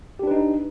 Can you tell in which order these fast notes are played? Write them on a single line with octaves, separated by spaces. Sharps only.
G4 D4 B4 D#4